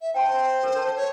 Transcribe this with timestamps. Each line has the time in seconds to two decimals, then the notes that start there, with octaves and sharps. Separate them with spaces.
0.01 E5
0.14 C5 G5 A5 C6
0.63 A4 A#4
0.78 A5
0.97 C#5